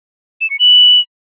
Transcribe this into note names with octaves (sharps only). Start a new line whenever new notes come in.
E7
C#7
F#7